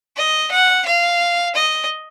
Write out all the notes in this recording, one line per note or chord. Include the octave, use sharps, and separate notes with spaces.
D#5
F#5
F5
D#5